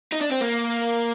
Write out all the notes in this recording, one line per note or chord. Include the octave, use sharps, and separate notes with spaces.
D#4
D4
C4
A#3